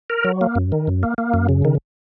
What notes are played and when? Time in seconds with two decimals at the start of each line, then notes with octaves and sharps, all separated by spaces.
0.10 A#4
0.24 F#3
0.41 A#3
0.55 F#2
0.72 D#3
0.87 F#2
1.03 A#3
1.18 A#3
1.34 F#2
1.49 C#3
1.65 D#3